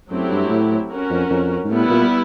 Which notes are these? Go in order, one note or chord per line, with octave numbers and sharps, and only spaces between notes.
F#2 F#3 A3 C4 E4 G4
G2
A2
C#4 F#4 A#4
F2
F2
G#2
A2 G3 B3 E4
A#2